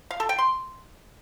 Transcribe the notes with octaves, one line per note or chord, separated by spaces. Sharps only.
F5
A4
G5
C6